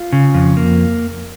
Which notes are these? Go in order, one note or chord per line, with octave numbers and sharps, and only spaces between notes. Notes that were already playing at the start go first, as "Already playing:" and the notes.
Already playing: F4
C#3
F2
A#3